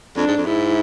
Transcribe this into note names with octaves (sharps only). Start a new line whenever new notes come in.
F2 D4
G#2
F2
G#2 E4